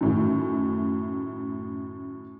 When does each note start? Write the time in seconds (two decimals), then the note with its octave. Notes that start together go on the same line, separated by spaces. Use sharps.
0.01 F#2 A2 D#3